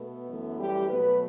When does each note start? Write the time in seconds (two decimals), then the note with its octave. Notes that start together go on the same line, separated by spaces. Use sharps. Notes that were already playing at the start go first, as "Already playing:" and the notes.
Already playing: B2 A3 B3
0.29 F#2 E3 A3
0.59 G3 G4
0.90 B2 F#3 A3 B3 B4